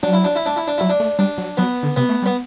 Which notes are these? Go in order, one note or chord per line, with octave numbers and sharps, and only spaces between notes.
F#3 D4
E4
D4
E4
D4
E4
D4
F#3 E4
D4
A3
G3 D4
F#3
F#3 B3
D3
C3 B3
A3
G3
B3